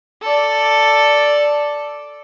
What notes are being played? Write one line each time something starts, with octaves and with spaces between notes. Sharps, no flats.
A4 D5